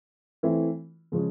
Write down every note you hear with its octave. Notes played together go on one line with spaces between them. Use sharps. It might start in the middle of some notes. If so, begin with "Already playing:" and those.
E3 A3 C4 E4
C#3 F3 G#3 C#4